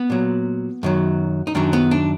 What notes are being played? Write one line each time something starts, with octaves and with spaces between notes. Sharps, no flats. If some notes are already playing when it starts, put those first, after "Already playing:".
Already playing: B3
A#2 F#3
F#2 D#3 F#3
D#4
F#2 D#3 F#3 D4
B3
D4